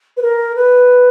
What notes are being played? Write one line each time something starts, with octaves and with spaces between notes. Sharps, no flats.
B4
A#4
B4